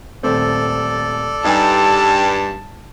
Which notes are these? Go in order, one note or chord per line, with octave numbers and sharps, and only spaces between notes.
D#1 A3 C4 A4 D5
G2 D#4 G#5 A5